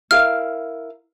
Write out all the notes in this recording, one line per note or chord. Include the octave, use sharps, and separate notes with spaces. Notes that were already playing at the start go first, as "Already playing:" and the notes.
E4 A#4 F5 F6